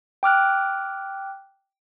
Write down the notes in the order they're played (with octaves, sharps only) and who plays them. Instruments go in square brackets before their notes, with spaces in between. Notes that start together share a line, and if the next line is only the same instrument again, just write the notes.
[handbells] G5 D6 F6 F#6